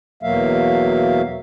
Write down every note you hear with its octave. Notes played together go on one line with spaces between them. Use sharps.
E2 B2 F#3 A#3 E5 F5